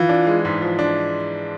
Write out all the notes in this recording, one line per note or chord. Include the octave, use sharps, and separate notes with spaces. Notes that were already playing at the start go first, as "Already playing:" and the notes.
Already playing: E3 F4
D4
G#3
G#2
F3
D4